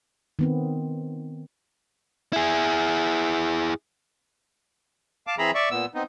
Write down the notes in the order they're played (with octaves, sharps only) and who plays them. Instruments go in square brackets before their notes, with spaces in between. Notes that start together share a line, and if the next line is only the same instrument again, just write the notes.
[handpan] D#3 B3 C4
[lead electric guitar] E4 G#4
[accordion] F5 A5 D6
E3 C4 G#4 E5 A#5 B5
D5 E5 C#6
A#2 B3 E6
B3 C4 D#4